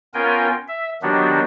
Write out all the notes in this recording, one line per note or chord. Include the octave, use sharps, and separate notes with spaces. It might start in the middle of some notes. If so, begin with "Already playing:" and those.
B3 C#4 F4 A#4 G5 G#5
E5
D#3 F#3 B3 D4 F#4 G4